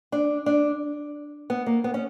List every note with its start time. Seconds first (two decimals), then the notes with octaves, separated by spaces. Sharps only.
0.12 D4
0.46 D4
1.50 B3
1.66 A#3
1.84 B3
1.94 C#4